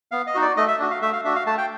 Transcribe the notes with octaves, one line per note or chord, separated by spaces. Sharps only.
B3 F5
D#5
D#4 F#4
D5
A3 D#5
E5
D4 F#4
F5
A3 E5
F5
D4 F#4 E5
F5
A3 A5
G5